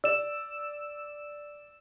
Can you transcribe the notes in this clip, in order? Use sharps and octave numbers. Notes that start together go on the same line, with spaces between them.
D5 E6 E7